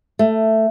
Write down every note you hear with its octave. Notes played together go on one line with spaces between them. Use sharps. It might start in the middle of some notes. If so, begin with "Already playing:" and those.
A3